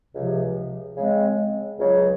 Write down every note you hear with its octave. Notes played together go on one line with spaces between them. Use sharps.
C#2 C3 F3
C#3 G#3 C4
C#2 C#3 F#3